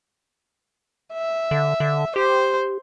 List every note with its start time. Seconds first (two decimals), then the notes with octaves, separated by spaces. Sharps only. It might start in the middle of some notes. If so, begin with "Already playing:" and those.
1.13 E5
1.51 D3
1.80 D3
2.16 G4 C5